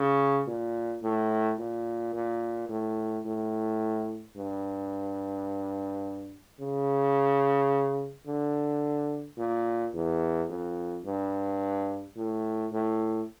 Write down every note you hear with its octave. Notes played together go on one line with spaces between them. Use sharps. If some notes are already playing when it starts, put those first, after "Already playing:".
Already playing: C#3
A#2
A2
A#2
A#2
A2
A2
G2
C#3
D3
A#2
E2
F2
G2
A2
A2